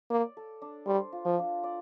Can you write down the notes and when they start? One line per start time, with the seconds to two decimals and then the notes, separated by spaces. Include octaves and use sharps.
0.11 A#3 D5
0.37 A4
0.62 D4
0.87 G3 C5
1.12 F4
1.26 F3
1.39 D4
1.63 D5